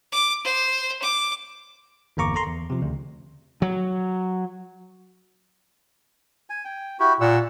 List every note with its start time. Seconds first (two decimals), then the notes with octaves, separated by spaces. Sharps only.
0.12 D6
0.44 C5
1.02 D6
2.17 G1 E2 A#3 A#5 C#6 D6
2.35 A4 A#5 C6
2.47 E2
2.70 C3 F3
2.82 D2 C#3
3.62 F#3
6.50 G#5
6.65 G5
7.00 E4 F#4 G4
7.21 A#2 F#5 E6